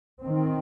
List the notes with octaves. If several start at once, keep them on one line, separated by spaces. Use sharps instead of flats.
D#3 C4